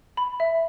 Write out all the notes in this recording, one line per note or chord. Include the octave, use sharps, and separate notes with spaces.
B5
E5